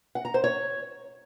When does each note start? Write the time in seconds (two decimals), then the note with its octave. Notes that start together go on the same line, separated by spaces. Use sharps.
0.15 F#5
0.25 A#5
0.34 C5
0.44 C#5